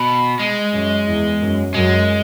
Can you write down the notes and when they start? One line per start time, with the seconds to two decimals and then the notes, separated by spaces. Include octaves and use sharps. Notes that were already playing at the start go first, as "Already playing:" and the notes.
Already playing: B2
0.39 G#3
0.73 F#2
1.07 E2
1.41 F#2
1.74 F#2 G#3